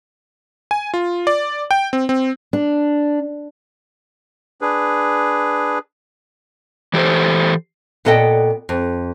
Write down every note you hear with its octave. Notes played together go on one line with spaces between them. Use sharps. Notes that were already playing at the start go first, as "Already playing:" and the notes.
G#5
F4
D5
G5
C4
C4
D4
D4 G#4 B4
E3 G4 A4 C5
A#2 B3 A4 D5 D#5 G5
F2